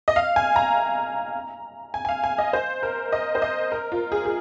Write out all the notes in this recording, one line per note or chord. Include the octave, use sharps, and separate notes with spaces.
D#5
F5
G#5
A#5
G#5
G#5
F5
G#5
D#5
C5
A#4
D#5
C5
D#5
A#4
F4
G#4
G#4